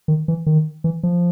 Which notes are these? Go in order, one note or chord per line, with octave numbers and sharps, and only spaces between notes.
D#3
E3
D#3
E3
F3